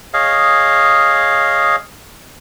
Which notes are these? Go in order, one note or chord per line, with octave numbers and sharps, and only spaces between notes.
G#4 C#5 D#5 F5